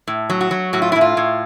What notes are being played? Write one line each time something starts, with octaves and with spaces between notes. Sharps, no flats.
A2
F#3
F#4
F#3
A2 F#4
F4
E4
A2
F4
A2